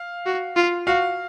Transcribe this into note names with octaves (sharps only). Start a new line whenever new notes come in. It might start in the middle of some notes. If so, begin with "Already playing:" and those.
Already playing: F5
F#4
F4
F#4 F5